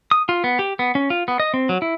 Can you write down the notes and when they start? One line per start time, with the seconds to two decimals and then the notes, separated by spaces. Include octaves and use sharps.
0.11 D#6
0.29 F4
0.44 B3
0.59 G4
0.79 B3
0.95 C#4
1.10 F4
1.28 B3
1.40 D#5
1.54 C4
1.69 F#3
1.82 E4